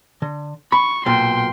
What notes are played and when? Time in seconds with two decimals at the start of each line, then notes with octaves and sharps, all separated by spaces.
0.22 D3
0.72 B5 C#6
1.06 B1 A#2 G5 C6